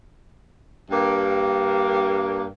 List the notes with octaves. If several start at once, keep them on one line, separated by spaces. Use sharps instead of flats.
G2 A#3